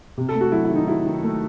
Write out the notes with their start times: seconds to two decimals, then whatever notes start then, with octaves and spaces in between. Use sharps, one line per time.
0.18 C3
0.29 A4
0.35 A3
0.41 F#4
0.52 F#3 E4
0.64 E4
0.70 D#3
0.75 D#4
0.88 F#3 E4
1.05 D#3
1.24 A3